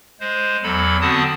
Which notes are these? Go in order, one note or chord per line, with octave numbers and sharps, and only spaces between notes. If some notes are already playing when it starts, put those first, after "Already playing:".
G#3 C5
E2 F#3 A4 B5
D3 B3 C4 F#4 A5 D#6